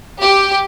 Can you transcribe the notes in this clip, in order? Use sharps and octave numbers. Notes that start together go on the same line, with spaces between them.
G4